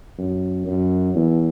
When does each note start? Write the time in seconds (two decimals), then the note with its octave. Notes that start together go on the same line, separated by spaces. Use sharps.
0.18 F#2
0.67 F#2
1.15 E2